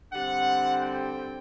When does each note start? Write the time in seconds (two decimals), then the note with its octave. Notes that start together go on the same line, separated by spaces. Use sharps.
0.11 D3 G3 C4 F#5
0.81 G5